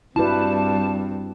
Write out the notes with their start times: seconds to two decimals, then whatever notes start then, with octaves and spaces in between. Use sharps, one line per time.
0.16 G2 G3 C4 E4 F#4 B4 A5